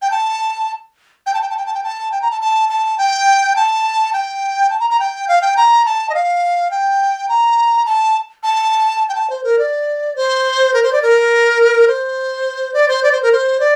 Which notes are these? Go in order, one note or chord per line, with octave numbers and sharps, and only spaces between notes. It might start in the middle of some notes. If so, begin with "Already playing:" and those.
G5
A5
G5
A5
G5
A5
G5
A5
G5
A5
G5
A#5
A5
A5
A5
G5
A5
G5
A5
A#5
A#5
G5
F5
G5
A#5
A5
D#5
F5
G5
A#5
A5
A5
G5
A5
C5
A#4
D5
C5
A#4
C5
D5
A#4
C5
D5
C5
D5
C5
A#4
C5
D5